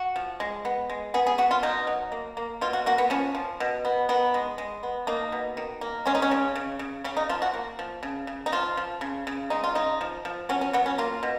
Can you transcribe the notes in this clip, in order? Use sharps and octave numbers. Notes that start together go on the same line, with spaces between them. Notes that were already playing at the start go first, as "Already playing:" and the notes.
Already playing: F#4
F3
G#3
B3
G#3
B3 G#4
G#4
B3 F#4
F4
B2 D#4
F#3
A#3
A#3
B2 F4
F#4
A#3 F#4
B3
F3 C#4
F3
B2
B3
D#3 B3
G#3
G#3
B3
A#3 D#4
B2
D#3
A#3
G#3 C#4
D#4
C#4
C#3
C#3
C#3
C#3 C#4
D#4
F3 F4
F#4
A#3
F3
C#3
C#3
D#4
F3 F4
F3
C#3
C#3
G#3 D#4
F4
C#3 D#4
F3
F3
F#3 C#4
C#4
F#3 B3
C#4
A#3 F4
B2